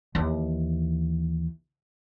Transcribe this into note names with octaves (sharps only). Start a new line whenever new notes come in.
D#2 E3